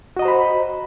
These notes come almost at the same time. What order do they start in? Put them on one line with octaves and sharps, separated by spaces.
F#4 D#5 A#5 C5 B5